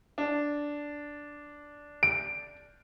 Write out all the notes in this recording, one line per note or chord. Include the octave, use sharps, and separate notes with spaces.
D4
D7